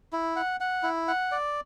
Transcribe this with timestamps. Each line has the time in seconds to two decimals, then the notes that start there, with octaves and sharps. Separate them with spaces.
0.13 E4
0.36 F#5
0.60 F#5
0.83 E4
1.08 F#5
1.32 D5